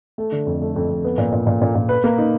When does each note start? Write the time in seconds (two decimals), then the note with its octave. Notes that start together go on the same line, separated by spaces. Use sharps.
0.18 A3
0.32 D3
0.47 F2
0.61 A3
0.76 F2
0.89 F2
1.04 B3
1.18 A#2
1.32 A#2
1.47 A#2
1.62 A#2
1.75 A#2
1.89 B4
2.04 A#3
2.18 D#4